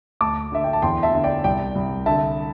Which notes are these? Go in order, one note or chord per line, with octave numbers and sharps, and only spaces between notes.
D2 A5 D6
D3 E5
G5
A5
E2 G5 C6
E5 A5
D3
D5 G5
C2 D5 G5
C2
D3 E5 A5